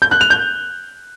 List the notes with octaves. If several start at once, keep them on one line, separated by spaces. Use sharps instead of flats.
G6
F#6
F7
G6